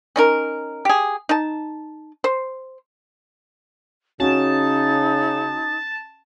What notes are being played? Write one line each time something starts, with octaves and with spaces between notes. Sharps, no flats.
C#4 D#4 A#4
G4 G#4
D#4 A5
C5
C#3 C#4 D#4 F#4 A5